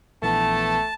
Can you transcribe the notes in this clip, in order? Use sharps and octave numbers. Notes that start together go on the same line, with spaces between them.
A#1 E3 A3 B3 A5